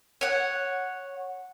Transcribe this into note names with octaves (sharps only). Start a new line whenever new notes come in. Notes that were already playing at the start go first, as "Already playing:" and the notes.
C#5 F#5